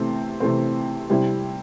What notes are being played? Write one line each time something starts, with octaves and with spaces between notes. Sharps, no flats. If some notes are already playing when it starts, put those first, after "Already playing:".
Already playing: C3 E3 A3 C4
C3 E3 A3 C4
C3 G3 C4 E4